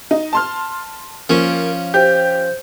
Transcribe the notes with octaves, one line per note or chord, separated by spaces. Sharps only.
D#4
A5 C6 F6
F3 A#3 C#4
G4 C5 G6